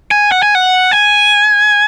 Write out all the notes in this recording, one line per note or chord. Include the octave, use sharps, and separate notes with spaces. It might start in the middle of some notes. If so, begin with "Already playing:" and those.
G#5
F#5
G#5
F#5
G#5